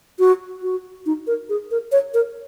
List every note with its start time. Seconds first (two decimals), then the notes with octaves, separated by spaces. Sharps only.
0.19 F#4
0.62 F#4
1.06 D#4
1.27 A#4
1.49 G#4
1.71 A#4
1.92 C#5
2.14 A#4